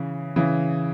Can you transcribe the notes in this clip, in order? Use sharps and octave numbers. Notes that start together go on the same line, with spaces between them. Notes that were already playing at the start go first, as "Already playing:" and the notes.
Already playing: C#3 E3
C#3 E3